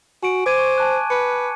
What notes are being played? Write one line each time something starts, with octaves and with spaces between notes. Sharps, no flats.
F#4 G#5 D7
C5 D6 G#6 D#7
C#6
G#5 A5 F#6
B4 C#7